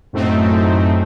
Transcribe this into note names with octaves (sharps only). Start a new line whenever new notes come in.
F#2 A2 A3 C4 D#4